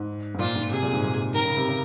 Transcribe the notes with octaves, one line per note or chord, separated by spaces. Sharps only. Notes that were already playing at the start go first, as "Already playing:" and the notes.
Already playing: G#2
G#2
A#2 F4
G#2
C3 G#4
A#2
G#2
A#2
D#3 A#4
C#3
C3
C#3